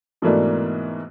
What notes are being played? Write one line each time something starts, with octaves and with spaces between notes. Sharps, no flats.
G#2 B2 E3 A3 A#3 D4